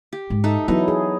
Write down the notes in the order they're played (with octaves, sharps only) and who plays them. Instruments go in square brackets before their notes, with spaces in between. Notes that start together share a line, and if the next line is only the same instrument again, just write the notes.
[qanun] G4
[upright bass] G#2
[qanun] D#4 A4 E5
[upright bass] E3 [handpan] F#3 B3 E4 [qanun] D#4
[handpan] G#4